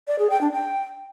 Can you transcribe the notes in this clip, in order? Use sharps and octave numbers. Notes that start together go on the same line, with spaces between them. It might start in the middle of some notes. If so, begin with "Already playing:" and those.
D5
G#4
G5
D4
G5